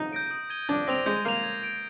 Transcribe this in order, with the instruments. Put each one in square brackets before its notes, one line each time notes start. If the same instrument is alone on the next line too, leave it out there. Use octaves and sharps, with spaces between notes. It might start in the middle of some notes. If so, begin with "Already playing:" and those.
Already playing: [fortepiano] D#4
[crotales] G6 A#6 D7
D#6
G#6 D#7 G7
[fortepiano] D4 [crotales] G6
[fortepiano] C4 [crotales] A#6 F7
[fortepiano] G#3 [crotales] G6
[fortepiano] A#3 [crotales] C7 F7
[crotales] G#6
D7 F7